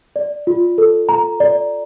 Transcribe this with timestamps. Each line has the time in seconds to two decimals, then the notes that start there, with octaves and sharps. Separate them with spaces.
0.16 D5
0.47 F4
0.78 A4
1.09 A#5
1.40 D5